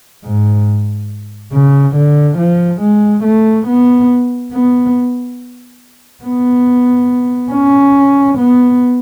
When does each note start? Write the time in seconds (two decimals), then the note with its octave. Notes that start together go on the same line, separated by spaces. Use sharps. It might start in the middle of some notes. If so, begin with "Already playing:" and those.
0.24 G#2
1.52 C#3
1.95 D3
2.38 F3
2.81 G#3
3.24 A3
3.67 B3
4.52 B3
6.24 B3
7.51 C#4
8.38 B3